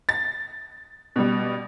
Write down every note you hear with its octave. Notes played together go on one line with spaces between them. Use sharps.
A6
B2 G3